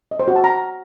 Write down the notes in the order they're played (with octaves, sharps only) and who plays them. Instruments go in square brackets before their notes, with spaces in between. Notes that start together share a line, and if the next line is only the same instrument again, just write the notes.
[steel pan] D#5
C5
F#4
A5
A#5